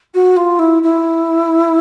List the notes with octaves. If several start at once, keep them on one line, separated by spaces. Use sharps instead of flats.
F#4
F4
E4
E4